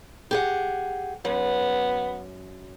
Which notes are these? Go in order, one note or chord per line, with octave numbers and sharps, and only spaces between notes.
G4 G#4 F#5
F#2 B3